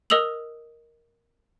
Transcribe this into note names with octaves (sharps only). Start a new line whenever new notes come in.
A#4 D#5 D#6 E6 F7 F#7